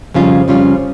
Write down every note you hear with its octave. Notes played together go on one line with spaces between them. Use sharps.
F2 C#3 G3 C#4 F4
F2 C#3 G3 C#4 F4